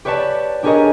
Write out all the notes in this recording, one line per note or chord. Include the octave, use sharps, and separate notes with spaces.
G4 B4 C#5 D5 A5
D4 G4 G#4 A#4 C#5 D#5